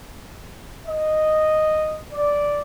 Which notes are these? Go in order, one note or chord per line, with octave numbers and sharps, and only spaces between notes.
D#5
D5